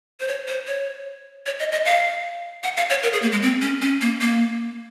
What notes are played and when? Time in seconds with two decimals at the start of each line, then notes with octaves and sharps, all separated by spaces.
0.20 C5
0.28 C#5
0.48 C5
0.67 C#5
1.46 C#5
1.59 D#5
1.72 D#5
1.85 F5
2.64 F#5
2.77 F5
2.90 C#5
3.03 A#4
3.13 G#4
3.22 A#3
3.32 G#3
3.42 C4
3.62 C#4
3.82 C#4
4.01 A#3
4.21 A#3